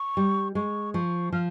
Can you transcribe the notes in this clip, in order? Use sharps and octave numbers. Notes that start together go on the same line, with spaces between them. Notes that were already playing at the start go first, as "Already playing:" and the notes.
Already playing: C#6
G3
G#3 C#6
F3 C#6
F3 F6